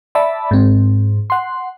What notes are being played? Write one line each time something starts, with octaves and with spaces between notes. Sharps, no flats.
D5 E5 A5 B5
G#2 C4
F#5 C6